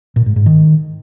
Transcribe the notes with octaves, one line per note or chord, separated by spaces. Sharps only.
A#2
G#2
G#2
D#3